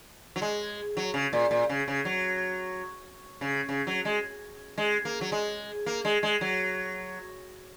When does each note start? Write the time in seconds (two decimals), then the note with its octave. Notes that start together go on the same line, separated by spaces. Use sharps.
0.36 F#3
0.42 G#3
0.97 F#3
1.14 C#3
1.33 A#2
1.51 A#2
1.69 C#3
1.88 C#3
2.05 F#3
3.41 C#3
3.69 C#3
3.87 F#3
4.05 G#3
4.78 G#3
5.05 A#3
5.21 F#3
5.32 G#3
5.86 A#3
6.05 G#3
6.23 G#3
6.41 F#3